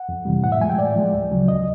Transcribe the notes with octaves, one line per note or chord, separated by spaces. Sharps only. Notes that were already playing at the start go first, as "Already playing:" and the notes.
Already playing: F#5
F2
C3 E3 G3
A2 F#5
E5
F3 G#3 G#5
G5
A2 D5
F3 G#3
D2
C#3 F#3
D2 D#5